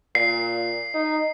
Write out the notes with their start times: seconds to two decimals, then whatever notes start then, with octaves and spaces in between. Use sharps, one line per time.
0.15 A#2 C7
0.94 D#4